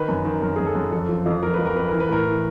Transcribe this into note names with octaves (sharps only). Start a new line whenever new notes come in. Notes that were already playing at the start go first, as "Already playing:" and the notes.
Already playing: D#3 B4
F#2
D#3
F#2 A#4
F#2 G#4
A4
F#2
F2 A4
F3
F2
F3 A#4
F2 B4
A#4
F2 B4
E3 A#4
B4
A2 A#4
E3